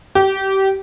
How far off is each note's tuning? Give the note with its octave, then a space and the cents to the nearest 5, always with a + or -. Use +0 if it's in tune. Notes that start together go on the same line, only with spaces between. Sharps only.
G4 -25